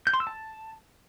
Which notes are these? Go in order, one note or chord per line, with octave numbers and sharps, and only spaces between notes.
G6
C6
E6
A5